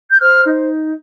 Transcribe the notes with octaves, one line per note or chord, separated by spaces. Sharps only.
G6
C5 F6
D#4